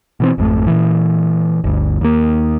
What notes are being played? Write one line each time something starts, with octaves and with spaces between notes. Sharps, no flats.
B2 E3 C4
G#1 F2 D#3 A3
A#2 E3
G1 D2
D#2 A#3